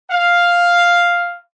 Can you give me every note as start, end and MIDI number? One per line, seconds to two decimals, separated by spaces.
0.10 1.36 77